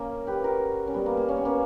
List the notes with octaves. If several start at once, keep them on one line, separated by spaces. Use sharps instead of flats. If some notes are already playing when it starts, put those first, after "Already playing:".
Already playing: A#3 C#4
G4 B4
F#4 A#4
C#4
G3 B3
A#3
A#3
C#4
B3
A#3 C#4